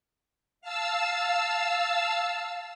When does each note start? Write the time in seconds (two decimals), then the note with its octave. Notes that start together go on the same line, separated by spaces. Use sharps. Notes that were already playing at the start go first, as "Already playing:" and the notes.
0.61 F5 A5 E6